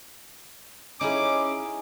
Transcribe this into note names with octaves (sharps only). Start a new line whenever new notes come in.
C#4 D#4 E4 G#4 D6